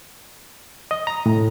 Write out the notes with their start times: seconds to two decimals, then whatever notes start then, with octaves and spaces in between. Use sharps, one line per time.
0.91 D#5
1.07 A#5
1.26 A2